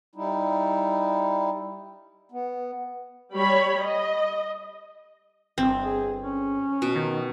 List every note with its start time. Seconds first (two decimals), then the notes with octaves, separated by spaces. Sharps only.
0.16 G3 D#4 E4
2.32 B3
3.34 G3 C#5 B5
3.84 D#5
5.58 G1 C4
5.84 G#4
6.22 C#4
6.82 B2
6.96 D#3